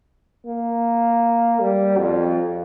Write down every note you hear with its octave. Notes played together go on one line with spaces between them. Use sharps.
A#3
G3
F2